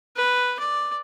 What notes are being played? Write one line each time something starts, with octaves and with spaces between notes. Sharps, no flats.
B4
D5